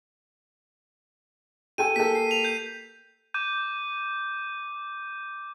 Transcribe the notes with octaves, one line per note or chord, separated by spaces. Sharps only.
G4 A4 G#5 D#7
A#3 G4 A4 B6
C7
F7
G6
D6 G6 D#7